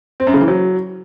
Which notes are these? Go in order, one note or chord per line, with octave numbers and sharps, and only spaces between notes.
C4
F#2
C#3
E3
F#3